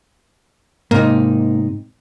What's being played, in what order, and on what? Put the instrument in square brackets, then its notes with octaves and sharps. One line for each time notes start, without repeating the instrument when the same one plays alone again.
[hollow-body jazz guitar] G#2 C3 D#4 [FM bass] A#3